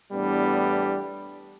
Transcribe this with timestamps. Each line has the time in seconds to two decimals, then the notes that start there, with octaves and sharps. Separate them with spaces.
0.13 E2 A2 G3 B3 D4